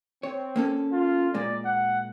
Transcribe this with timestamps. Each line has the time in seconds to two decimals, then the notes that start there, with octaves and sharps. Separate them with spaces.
0.23 C4 C#5
0.56 A#3 C#4 A4
0.92 F4
1.34 A#2 G#3 A#3 D5
1.65 F#5